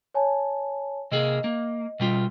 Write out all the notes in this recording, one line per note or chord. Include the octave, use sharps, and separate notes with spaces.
C#5 G#5 A5
C3 A#3 G#4 D#5
A#3
B2 G3 F4